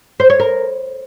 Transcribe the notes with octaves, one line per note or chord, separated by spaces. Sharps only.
C5
C#5
A#4